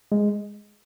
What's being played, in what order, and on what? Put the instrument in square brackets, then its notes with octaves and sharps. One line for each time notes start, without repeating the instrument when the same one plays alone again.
[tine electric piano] G#3